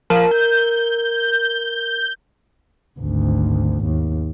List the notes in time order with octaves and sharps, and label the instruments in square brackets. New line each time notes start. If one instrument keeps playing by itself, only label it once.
[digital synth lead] F3 [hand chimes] A#4
[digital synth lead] G6
[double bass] G#1 D2
D#2